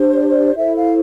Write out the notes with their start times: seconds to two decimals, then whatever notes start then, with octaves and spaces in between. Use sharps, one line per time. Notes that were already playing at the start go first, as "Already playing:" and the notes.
Already playing: D4 G4 C5
0.14 D5
0.30 D5
0.54 E4 A4 C5 E5
0.75 F5